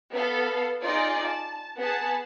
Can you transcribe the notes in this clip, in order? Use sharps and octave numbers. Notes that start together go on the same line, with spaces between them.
B3 A4 F5
D#4 F4 G#4 D5 D#5
A5
B3 G#4 F#5 A5